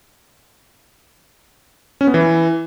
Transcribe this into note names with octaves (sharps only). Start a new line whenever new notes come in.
C#4
B3
E3